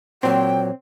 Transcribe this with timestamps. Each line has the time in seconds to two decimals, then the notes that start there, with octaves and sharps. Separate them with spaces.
0.23 A#2 F#3 C4 G5